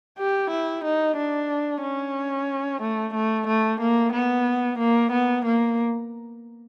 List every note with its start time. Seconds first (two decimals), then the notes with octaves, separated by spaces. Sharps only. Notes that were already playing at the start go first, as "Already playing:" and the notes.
0.19 G4
0.50 E4
0.84 D#4
1.17 D4
1.82 C#4
2.82 A3
3.14 A3
3.47 A3
3.81 A#3
4.13 B3
4.78 A#3
5.12 B3
5.45 A#3